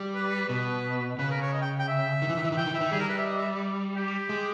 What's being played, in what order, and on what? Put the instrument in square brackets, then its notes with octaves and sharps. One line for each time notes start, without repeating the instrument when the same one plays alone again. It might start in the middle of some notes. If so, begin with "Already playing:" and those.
Already playing: [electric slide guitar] G3
[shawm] B4
[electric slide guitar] B2 [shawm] B4
[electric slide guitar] C#3 [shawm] B4
[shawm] A#4
C#5
D#5
G5
G5
E5
[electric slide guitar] D#3
E3
D#3
E3
D#3
[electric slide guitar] E3 [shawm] G5
[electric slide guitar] D#3
[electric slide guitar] E3 [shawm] E5
[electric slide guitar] D#3
[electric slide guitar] G3 [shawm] G#4
[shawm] A#4
B4
E5
D#5
E5
G4
[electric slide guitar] G#3